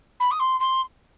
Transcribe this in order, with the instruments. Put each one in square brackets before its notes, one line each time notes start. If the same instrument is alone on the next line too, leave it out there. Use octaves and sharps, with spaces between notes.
[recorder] B5
D#6
C6
C6